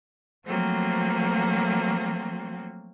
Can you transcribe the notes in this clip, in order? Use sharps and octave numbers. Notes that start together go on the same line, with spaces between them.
F3 F#3 A3 A#3 C4 F#4